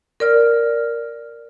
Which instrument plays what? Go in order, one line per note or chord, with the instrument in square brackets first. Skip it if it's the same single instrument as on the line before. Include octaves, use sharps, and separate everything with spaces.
[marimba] A#4 D5 F6